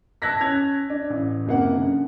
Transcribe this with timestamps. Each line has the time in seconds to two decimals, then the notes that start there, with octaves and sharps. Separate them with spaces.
0.22 A5 E6 F#6 G#6 A#6 B6
0.41 C#4 G#6 F7
0.90 D4
1.10 A1
1.46 F#1 C3 A#3 F#5
1.74 F#2 D3